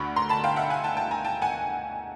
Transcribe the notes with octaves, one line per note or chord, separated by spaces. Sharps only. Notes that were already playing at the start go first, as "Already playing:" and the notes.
Already playing: D2 D3 B5 C#6
A#5 C6
A5 B5
F5 G5
E5 F#5
F#5 G#5
G5 A5
G5 A5
G#5 A#5
G5 A5
F#5 G#5